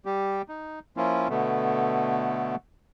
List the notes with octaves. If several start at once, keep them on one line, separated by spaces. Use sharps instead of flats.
G3 G4
D#4
F3 A#3 C#4 E4 F4
B2 D3 A3 B3